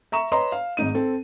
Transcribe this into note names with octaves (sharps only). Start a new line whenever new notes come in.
E5 A#5 C#6 E7
B4 C#5 D#5 A#5 C6
F5
G#1 G#2 D#4 D#7
C4 A4